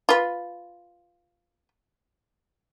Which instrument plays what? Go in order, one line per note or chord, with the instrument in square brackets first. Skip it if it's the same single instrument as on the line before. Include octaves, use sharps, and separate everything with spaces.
[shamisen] F4 B4